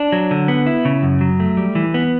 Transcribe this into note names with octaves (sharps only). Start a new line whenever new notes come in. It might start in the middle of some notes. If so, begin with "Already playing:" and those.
Already playing: D4
F#3
D3
B3
E4
C#3
F#2
F#3
A3
G3
E3
B3